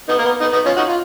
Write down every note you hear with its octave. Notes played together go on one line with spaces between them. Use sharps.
B3 D#4
A#3
B3
B3 D#4
B3 D#4
C#4 F4
D#4 F#4
F4